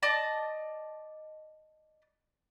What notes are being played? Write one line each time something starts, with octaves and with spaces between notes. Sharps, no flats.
D5 D#5 A5